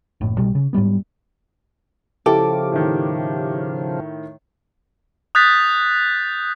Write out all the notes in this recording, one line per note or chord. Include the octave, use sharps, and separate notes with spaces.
F#1 A2
B1 B2 G3
C#3
G#2 F#3 G3 B3
C#3 F3 E4 G4 A4 D6
A2 D#3
D#6 F#6 G6 A6 B6